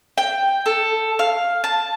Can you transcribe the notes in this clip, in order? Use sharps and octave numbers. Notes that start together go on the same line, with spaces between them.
G5
A4
F5
A5